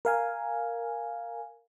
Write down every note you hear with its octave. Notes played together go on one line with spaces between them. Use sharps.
A#4 F5 G#5